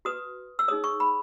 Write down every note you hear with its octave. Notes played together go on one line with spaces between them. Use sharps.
F#4 B4 D#6
E6
D#4 G#4 C#5 D#6
C#6
B5